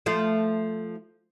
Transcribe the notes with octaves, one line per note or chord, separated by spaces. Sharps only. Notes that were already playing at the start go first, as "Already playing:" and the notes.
F3 A3 F4